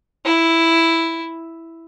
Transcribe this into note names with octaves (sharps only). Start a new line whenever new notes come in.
E4